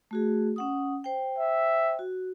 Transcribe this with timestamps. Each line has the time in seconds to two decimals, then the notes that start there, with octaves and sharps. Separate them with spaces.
0.11 A3 F#4 G#4
0.56 C#4 F#5 D#6
1.04 C5 G5
1.38 E5
1.99 F#4